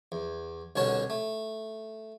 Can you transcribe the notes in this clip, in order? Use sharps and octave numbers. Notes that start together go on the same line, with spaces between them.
E2
C2 B2 D3 C#4 C#5 A5
A3